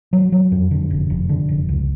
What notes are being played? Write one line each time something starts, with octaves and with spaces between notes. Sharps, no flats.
F#3
F#3
F2
D3
F1
F1
D3
F1
C#2